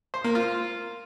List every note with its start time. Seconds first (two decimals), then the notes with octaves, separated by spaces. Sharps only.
0.14 C5
0.24 A#3
0.35 F4